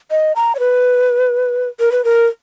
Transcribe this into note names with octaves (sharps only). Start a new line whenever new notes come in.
D#5
A#5
C#5
B4
A#4
B4
A#4